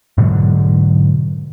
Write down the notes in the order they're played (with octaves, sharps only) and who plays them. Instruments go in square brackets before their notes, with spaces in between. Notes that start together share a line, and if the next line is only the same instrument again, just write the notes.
[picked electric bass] G#2 B2 D3 F#3